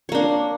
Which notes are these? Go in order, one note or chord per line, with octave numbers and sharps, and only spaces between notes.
A#3 D4 C#5